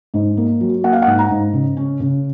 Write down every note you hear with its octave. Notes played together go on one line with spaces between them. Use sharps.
G#2
A#3
F#3
A#3 F#5
F5
G#2 F#5
A#5
G#2
C#3
C#4
C#3